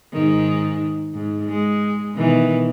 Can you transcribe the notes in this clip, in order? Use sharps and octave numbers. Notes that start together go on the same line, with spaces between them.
G#2 D#3
G#2
G#3
B2 D#3 E3